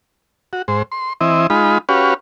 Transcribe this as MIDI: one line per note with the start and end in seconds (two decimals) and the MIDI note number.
0.53 0.62 66
0.68 0.83 44
0.68 0.83 72
0.92 1.13 84
1.21 1.47 52
1.21 1.47 60
1.21 1.47 64
1.21 1.47 75
1.50 1.78 56
1.50 1.78 63
1.50 1.78 65
1.50 1.78 83
1.89 2.14 61
1.89 2.14 66
1.89 2.14 67
1.89 2.14 71
1.89 2.14 73
1.89 2.14 77